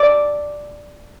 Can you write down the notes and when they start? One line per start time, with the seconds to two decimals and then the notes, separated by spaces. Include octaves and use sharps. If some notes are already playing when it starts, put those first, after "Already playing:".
Already playing: D5 D6